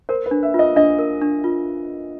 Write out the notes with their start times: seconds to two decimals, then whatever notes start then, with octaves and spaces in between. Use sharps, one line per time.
0.09 A#4 C5
0.26 B4
0.31 D4
0.43 E5
0.54 F4 D#5
0.76 D4 D#5
0.99 A#4
1.22 D4
1.44 F4